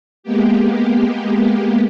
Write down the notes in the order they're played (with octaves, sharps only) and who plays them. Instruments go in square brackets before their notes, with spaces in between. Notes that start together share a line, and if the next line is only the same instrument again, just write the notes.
[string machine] G#3 A#3 B3 G4